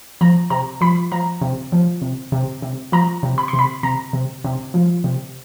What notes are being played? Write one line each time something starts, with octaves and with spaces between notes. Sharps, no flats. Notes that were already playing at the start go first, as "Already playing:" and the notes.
F3 A#5
C3 A#5
F3 B5
F3 A#5
C3
F3
C3
C3
C3
F3 A#5
C3
B5
C6
C3
B5
C3 A#5
C3
C3
F3
C3